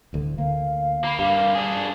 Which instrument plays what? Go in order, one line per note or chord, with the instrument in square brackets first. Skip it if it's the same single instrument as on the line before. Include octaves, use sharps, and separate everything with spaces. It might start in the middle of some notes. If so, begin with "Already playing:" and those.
[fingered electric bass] D1 D2 D3
[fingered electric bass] D2 D3 A#3 [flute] F5
[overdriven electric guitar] A#3 [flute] B5
[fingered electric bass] G2 [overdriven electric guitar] G3 A#3 [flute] F5
[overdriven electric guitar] D4 G#4 [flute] G#5